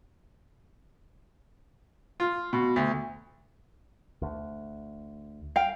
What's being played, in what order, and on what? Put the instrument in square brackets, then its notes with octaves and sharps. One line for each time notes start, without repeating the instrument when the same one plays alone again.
[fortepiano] F4
B2
D2
[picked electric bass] D2
[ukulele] F5 G5